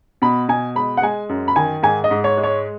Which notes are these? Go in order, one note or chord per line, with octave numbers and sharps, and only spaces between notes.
B2 B5
B2 G#5
G#3 B5
F#5
G#3 G#5
F#2
B5
D#3 G#5
G#2 G#5
D#5
G#2
C#5
G#3
C#5